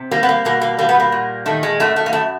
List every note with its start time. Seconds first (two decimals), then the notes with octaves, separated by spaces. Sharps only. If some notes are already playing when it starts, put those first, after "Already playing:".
Already playing: C3
0.11 G3 A#3
0.23 B3
0.29 A#3
0.45 B2 A#3
0.61 A#3
0.79 G3 A#3
0.89 B3
1.00 A#3
1.12 A#2
1.46 D#3 A3
1.63 G#3
1.80 F#2 A3
1.96 A3
2.06 A#3
2.13 F#2 A3